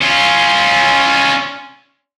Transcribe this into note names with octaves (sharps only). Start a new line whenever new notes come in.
C#4 F4